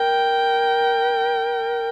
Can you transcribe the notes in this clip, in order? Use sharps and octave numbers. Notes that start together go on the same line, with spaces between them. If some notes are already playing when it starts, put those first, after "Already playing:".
Already playing: A#4 G5